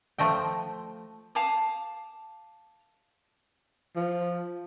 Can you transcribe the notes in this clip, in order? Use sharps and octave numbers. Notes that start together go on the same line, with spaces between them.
F3 A3 D#5 G5
F5 A5 D6 D#6
F3